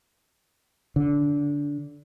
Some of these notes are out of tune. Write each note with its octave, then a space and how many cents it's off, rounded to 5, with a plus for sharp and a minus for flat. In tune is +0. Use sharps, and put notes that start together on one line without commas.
D3 -20